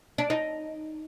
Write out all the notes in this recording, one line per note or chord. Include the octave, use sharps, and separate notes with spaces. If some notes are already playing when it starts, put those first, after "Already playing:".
D4
D#4